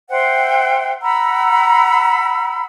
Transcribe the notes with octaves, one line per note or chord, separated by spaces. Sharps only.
C5 E5 F#5 G5
F#5 A#5 B5 E6